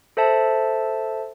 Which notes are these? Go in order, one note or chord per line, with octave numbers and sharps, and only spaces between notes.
A4 C5 E5 A5